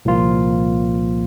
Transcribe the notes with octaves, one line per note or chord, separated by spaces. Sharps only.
C2 A#2 F3 A#3 F4